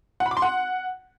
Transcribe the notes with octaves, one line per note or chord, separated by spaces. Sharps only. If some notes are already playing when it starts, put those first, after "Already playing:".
F#5
B5
D6
C6
F#5